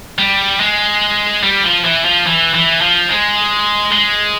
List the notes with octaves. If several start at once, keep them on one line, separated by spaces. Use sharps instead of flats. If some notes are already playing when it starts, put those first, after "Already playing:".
G3
G#3
G3
F3
E3
F3
E3
E3
F3
G#3
G#3